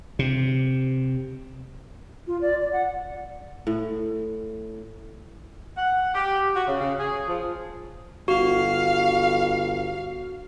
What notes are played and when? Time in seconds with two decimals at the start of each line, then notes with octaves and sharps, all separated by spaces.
0.19 C3
2.27 F4
2.41 D5
2.61 D5
2.73 F#5
3.67 A2
5.77 F#5
6.14 G4
6.55 F#4
6.67 C#3
6.80 C#3
6.98 G#4
7.27 F3
8.28 G1 F#4 F5